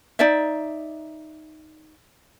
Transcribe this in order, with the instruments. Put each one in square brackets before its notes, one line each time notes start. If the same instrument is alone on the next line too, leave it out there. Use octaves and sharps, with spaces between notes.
[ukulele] D#4 D5 E5